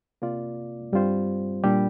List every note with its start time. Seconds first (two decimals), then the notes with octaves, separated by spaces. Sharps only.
0.22 C3 A#3 F4 D5
0.92 G2 G3 C4 F4 C5
1.64 A#2 G3 D4 G4